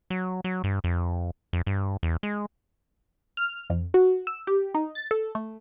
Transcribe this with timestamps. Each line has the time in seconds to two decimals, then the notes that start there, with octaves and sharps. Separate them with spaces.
0.10 F#3
0.44 F#3
0.64 G2
0.84 F2
1.53 F2
1.67 G2
2.03 E2
2.23 G#3
3.37 F6
3.70 F2
3.94 F#4
4.27 E6
4.47 G4
4.74 D#4
4.95 A6
5.11 A4
5.35 A3